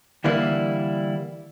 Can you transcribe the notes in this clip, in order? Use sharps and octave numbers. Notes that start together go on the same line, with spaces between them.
D3 E3 G3 A#3 E4